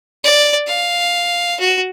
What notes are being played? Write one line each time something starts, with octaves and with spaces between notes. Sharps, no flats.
D5
F5
F#4